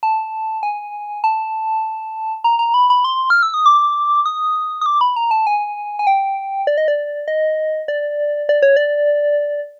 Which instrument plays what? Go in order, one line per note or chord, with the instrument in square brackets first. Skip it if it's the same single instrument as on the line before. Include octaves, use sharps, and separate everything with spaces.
[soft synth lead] A5
G#5
A5
A#5
A#5
B5
B5
C6
F6
E6
D#6
D6
D#6
D#6
D6
B5
A#5
A5
G#5
G#5
G5
D5
D#5
D5
D#5
D5
D5
C#5
D5